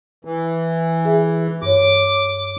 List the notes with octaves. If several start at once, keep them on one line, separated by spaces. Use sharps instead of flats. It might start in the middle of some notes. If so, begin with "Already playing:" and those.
E3
G#4 E5
G2 C#5 D6